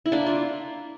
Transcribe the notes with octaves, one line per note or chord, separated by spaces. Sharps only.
E4
A#3 D4
D4 F4